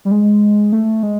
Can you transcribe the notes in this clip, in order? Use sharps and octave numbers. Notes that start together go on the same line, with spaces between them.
G3
G#3
A3
G#3